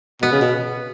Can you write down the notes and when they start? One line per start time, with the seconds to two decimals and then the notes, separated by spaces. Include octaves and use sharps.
0.22 B2 B3
0.32 C#3
0.41 B2